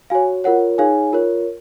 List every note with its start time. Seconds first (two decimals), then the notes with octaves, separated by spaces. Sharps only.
0.10 F#4 C#5 F5 G#5
0.44 F4 A#4 C#5 F#5
0.78 D#4 G#4 C#5 F5 G#5
1.13 F4 A#4 C#5